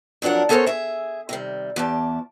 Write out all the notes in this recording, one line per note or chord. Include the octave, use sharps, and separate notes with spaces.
F2 F#3 D4 A#4 F#5
B3 C#4 A4 A#4 C5 C#5
G#4 E5
C3 D#3 G3
E2 G4 A5